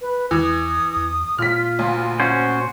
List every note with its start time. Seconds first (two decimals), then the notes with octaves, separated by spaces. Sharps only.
0.01 B4
0.31 E2 E3 D#6
0.96 E2
1.38 A#2 F4 F6 B6
1.79 D2
2.20 C#4 F#4 C5